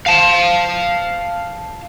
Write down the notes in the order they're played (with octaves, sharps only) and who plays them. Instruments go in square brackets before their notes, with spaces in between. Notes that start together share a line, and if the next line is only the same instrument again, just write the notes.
[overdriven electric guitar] F5 A5